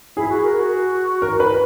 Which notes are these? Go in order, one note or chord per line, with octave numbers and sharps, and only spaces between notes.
E4 G#4
F#4
A#4
F#4
A#4
B4